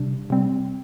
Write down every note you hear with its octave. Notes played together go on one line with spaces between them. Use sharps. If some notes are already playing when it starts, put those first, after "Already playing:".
Already playing: C3 G3 D4
C3 G3 C4